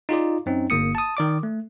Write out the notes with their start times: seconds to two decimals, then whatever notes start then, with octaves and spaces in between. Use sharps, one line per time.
0.09 D#4 F4 G#4 D5
0.46 F#2 C4 C#4 D#4
0.70 G1 A#3 D#6 C#7
0.95 A5 D#6
1.17 D#3 D5 D6
1.43 A3